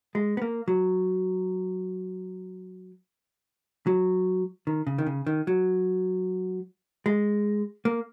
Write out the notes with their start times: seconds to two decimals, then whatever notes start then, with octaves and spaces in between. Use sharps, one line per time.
0.15 G#3
0.37 B3
0.42 A#3
0.68 F#3
3.87 F#3
4.67 D#3
4.87 C#3
4.98 D#3
5.06 C#3
5.27 D#3
5.47 F#3
7.06 G#3
7.85 A#3